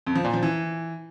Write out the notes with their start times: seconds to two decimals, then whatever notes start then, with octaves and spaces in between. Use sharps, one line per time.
0.07 F2
0.16 F3
0.25 A#2
0.34 F3
0.43 E3